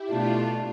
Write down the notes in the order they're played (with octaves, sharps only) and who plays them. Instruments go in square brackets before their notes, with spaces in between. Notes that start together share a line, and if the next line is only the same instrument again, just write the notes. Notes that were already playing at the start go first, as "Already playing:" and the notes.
Already playing: [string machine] E4 G4
[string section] B2 A3 D4 F4